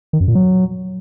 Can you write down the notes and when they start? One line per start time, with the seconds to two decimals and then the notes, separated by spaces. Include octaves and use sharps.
0.13 D#3
0.20 F#2
0.28 A#2
0.35 F#3